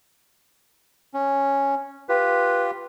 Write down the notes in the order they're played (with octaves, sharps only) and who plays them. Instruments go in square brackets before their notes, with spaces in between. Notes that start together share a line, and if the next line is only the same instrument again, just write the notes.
[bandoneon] C#4
[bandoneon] F4 G4 [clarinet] B4